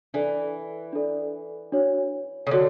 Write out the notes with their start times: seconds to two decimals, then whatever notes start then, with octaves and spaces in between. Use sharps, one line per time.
0.14 E3 D4 A4 D5
0.93 D4 A4 D5
1.72 D4 F#4 C#5
2.47 C#3
2.51 D3 F#4 C#5